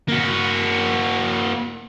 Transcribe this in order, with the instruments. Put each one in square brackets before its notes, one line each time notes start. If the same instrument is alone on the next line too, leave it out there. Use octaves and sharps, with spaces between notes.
[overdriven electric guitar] A#3 F#4